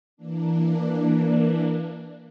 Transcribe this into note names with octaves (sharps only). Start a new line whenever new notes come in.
E3 A#3 D4